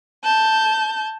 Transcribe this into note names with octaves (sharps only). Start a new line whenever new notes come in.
A5 G6